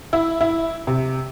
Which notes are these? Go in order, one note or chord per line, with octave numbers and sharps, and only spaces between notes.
E4
E4
C3